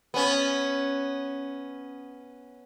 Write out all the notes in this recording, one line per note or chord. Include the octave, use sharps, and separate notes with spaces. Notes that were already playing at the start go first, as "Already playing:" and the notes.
B3 C#4